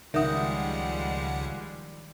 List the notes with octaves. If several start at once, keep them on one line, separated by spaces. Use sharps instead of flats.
C#2 D#3 F3 G3 G#3 E5 F#5 D#6